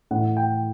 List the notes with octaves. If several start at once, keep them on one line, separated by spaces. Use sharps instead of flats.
A2 E3 F#5
G5